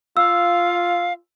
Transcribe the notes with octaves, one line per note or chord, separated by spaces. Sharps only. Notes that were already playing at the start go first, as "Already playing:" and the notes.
F4 F5 E6